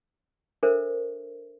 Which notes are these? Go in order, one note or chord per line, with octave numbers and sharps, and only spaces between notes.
D4 A4 A#4 C5 E5